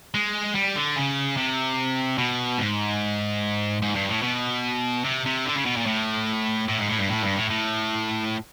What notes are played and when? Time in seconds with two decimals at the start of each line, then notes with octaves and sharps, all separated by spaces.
0.14 G#3
0.55 G3
0.76 D3
0.96 C#3
1.37 C3
2.18 B2
2.59 G#2
3.82 G#2
3.95 G2
4.09 A2
4.23 B2
5.05 C3
5.26 C3
5.46 D3
5.56 C#3
5.65 B2
5.76 A#2
5.86 A2
6.68 A2
6.79 G#2
6.89 A2
6.99 G2
7.09 A2
7.23 G2
7.36 A2
7.50 A2